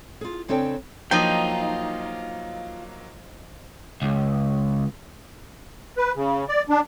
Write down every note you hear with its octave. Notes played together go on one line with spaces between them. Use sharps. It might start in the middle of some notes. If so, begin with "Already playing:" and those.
F4 G#4
C#3 C4 D4 A4 C#5 G5
F3 F#3 A#3 D#4 F4 D#5 G5
C#2
B4
C#3
D5
D4